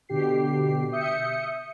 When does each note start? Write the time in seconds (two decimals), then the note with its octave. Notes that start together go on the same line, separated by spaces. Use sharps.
0.09 B2 D3 G4 C7
0.92 E5 D#6 G6 C#7